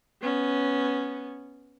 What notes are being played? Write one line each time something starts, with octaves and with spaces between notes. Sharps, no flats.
B3 C#4